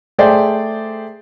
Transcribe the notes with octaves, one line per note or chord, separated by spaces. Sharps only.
A3 G#4 C5 D5 E5 G5